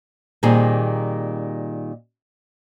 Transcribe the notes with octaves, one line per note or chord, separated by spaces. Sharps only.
A#2 D#3 G3 C4 G#4